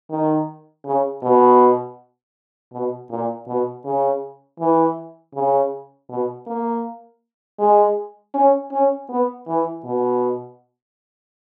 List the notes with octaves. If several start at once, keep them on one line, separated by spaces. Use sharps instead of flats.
D#3
C#3
B2
B2
A#2
B2
C#3
E3
C#3
B2
A#3
G#3
C#4
C#4
B3
E3
B2